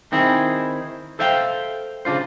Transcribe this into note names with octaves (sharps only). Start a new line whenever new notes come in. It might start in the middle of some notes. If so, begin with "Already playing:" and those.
D#3 C4 E4 G#4
A4 C5 E5 F5 G5
C#3 D4 F4 C5